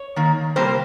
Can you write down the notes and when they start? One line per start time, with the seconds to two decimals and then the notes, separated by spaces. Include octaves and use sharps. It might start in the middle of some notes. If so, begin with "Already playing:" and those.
Already playing: C#5
0.16 D#3 A#3
0.56 C3 G3 A#3 C5